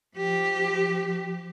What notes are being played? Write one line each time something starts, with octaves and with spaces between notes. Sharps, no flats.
F3 G4